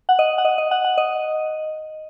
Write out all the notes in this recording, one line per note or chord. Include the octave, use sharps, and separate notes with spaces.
F#5
D#5
F#5
D#5
D#5
F#5
F#5
D#5